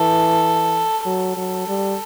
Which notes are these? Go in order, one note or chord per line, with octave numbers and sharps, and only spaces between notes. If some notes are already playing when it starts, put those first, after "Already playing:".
Already playing: E3 A4
F#3 A4
F#3
G3